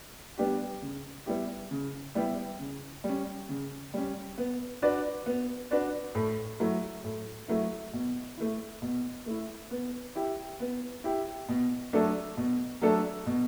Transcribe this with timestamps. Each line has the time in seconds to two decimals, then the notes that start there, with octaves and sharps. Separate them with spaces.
0.38 G3 B3 D4 G4
0.82 C#3
1.26 G3 B3 E4 G4
1.71 C#3
2.15 G3 B3 E4 G4
2.59 C#3
3.04 G3 C#4
3.49 C#3
3.94 G3 C#4
4.38 B3
4.82 D4 F#4 B4 D5
5.26 B3
5.71 D4 F#4 B4 D5
6.15 A2
6.60 F#3 A3 E4
7.04 A2
7.48 F#3 A3 E4
7.93 B2
8.37 A3 E4
8.82 B2
9.26 A3 E4
9.71 B3
10.15 E4 G4
10.60 B3
11.04 E4 G4
11.49 B2
11.93 F#3 A3 D4 A4
12.37 B2
12.82 F#3 A3 D4 A4
13.26 B2